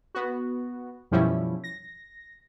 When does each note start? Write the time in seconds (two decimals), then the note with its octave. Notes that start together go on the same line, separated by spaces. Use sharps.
0.15 B3 F#4
1.11 F#2 B2 F3 G3 C#4 E4
1.64 A#6